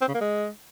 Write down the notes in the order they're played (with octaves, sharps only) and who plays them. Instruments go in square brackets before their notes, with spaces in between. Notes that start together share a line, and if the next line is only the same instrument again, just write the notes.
[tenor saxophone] C4
C#3
A#3
G#3